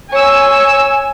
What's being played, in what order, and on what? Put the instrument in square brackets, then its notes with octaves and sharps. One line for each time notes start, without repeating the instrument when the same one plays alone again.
[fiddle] C#5 E6 [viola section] G#5